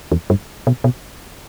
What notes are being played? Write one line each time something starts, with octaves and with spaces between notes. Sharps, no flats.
E2
G2
B2
B2